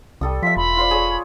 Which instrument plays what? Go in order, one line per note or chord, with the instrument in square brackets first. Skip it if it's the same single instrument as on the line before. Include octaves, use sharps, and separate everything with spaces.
[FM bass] C2 [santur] G3 A4 D#6
[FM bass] F3 [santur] F4 E5 [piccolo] B6
[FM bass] E1 [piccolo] B5
[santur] F4 C5 D5
G#4 C#5 D5